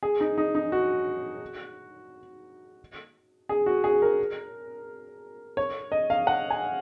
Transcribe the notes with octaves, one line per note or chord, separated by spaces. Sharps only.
G#4
D#4
D#4
D#4
F#4
G#4
F#4
G#4
A#4
C#5
D#5
F5
F#5
G#5